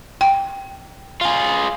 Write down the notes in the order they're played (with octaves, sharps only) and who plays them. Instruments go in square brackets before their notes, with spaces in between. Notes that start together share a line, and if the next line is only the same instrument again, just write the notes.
[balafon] G5
[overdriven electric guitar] F4 G#4